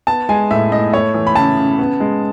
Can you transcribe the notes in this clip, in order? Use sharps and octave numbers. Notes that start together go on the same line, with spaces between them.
B3 A5
G#3 G#5
A2 E5
A2 D#5
A3 C#5
E3
B5
C#3 A5
C#3
B3
G#3